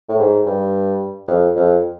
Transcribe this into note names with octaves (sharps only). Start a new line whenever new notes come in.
A2
G#2
G2
F2
F2